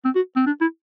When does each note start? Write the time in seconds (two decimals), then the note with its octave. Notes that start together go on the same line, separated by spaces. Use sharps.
0.05 C4
0.15 F#4
0.36 C4
0.46 D4
0.61 E4